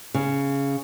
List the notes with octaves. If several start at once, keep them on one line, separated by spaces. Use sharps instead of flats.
C#3